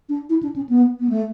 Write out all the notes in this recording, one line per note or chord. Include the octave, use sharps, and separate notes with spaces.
D4
E4
D4
C#4
B3
B3
A3